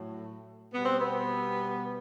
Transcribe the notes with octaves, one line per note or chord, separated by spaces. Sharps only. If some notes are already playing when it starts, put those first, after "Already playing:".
Already playing: A2 F#3 A3
B2 G3 B3
C4
B3